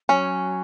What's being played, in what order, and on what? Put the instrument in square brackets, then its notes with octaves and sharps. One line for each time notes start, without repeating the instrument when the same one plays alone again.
[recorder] F#3 [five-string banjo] C#4